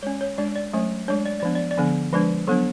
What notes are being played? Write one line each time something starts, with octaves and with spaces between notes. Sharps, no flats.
G#3 C#4 C#5
C#5
G#3 D4 D5
D5
F#3 A3 C#4
G#3 D4 C#5
D5
D5
F3 B3 D4
D5
D5
D3 F3 B3 D4
F3 G#3 D4 B4
F#3 B3 D4 A4